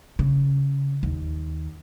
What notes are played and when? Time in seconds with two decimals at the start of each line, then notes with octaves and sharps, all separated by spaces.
0.19 C#3
1.03 D#2